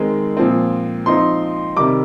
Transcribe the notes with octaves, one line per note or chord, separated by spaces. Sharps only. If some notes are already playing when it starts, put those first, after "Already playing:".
Already playing: D#3 G#3 C4
A#2 F3 C4
F3 C4 D#4 C6
C3 D#3 G3 D6